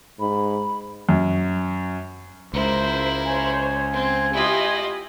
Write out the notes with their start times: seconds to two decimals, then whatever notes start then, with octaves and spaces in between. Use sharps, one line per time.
0.20 G#2 B5
1.09 F#2
2.54 C#2 E4 A#4 C5
3.26 C5 C#5 G#5
3.92 C4 C5
4.33 E4 F4 G4 D#5